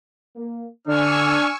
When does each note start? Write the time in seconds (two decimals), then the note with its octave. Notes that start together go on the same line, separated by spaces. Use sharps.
0.36 A#3
0.88 D3 D4 G#5 C#6 E6 F6